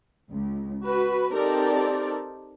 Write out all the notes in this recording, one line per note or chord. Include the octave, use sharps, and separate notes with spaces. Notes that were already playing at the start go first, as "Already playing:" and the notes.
C#2
F#4 B4
C4 D#4 G4 A4 A#4 D5